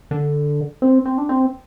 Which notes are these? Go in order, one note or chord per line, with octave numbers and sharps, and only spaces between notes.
D3
C4
C4
D4
C4